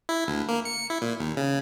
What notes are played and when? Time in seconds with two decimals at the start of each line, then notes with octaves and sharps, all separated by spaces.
0.09 E4
0.28 D2
0.48 A#3
0.65 C#7
0.90 E4
1.02 A#2
1.19 D#2
1.37 C#3